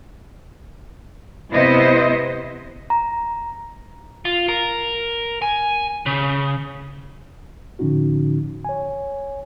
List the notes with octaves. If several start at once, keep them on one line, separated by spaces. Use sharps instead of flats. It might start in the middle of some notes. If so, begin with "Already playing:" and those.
C3 B3 E4 C5 D#5
A#5
F4
A#4
G#5
C#3
A2 D3 F3 C#4 D#4 F#4
C#5 G#5